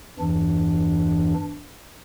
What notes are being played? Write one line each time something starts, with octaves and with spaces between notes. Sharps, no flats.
E2 G2 E3 D4